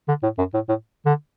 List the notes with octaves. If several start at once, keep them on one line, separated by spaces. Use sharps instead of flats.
D3
A2
F#2
A2
A2
D3